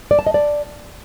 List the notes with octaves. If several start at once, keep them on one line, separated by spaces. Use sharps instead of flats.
D5
A5
D#5
D5